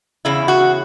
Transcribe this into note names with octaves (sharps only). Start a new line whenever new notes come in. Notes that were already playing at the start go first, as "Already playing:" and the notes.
E2 C#3 E4
F#4